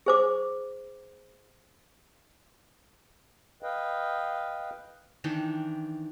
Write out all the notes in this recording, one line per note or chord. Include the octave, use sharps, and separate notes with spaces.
G#4 C5 D6
B4 D#5 F5 G5
D#3 E3 D4 G5